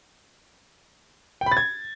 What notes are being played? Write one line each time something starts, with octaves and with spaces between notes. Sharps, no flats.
G5
B5
A6
G#6